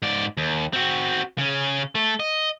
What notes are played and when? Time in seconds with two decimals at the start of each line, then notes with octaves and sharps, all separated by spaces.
0.02 G#2 D5
0.37 D#2
0.73 C4 F#4
1.38 C#3 C#4
1.95 A3 A4
2.20 D#5